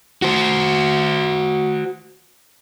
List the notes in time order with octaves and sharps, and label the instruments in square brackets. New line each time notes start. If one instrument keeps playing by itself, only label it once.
[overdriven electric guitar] F#4 C5